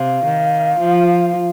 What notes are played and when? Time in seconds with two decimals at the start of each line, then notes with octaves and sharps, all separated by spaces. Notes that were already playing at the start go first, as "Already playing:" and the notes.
Already playing: C3 F5
0.25 D#3
0.79 F3